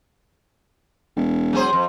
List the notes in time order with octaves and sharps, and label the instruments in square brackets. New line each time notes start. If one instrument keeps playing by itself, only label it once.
[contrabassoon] E1
[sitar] F#3 G#4 C5
F2